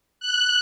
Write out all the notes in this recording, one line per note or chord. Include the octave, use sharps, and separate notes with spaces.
F#6